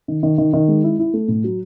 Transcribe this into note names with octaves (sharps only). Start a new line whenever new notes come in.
D#3
D#3
D#3
D#3
G#3
E4
E4
A3
A2
F#3